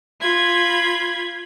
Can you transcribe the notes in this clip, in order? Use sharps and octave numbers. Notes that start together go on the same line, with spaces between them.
F4 B5 G#6